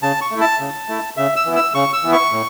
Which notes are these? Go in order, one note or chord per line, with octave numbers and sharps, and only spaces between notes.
C#3 A5
C#6
A3 E4
A5
C#3
A3 E4
C#3 E5
E6
E3 B3 E4
E6
C#3 C#6
E6
E3 B3 E4
C#6
A2